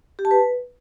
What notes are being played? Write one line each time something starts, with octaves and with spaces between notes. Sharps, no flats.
G4
A5
B4